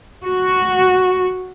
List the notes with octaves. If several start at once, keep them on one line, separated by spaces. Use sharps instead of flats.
F#4